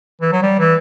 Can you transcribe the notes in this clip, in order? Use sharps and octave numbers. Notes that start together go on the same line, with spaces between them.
E3
F#3
G3
E3